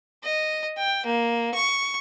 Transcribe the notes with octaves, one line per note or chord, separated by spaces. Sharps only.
D#5
G5
A#3
C#6